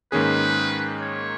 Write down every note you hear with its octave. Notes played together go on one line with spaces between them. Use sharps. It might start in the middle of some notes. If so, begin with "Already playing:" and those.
G#2 D#3 A#3 C#4 G#4 B4
C#5